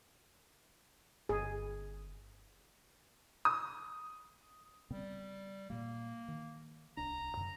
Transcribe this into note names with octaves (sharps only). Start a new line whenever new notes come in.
G1 G#4
D#6
C#3 G3 B3 C4
A#2 G3 A#3
D#3
D1 C2 D4 A#5
F#2 C#3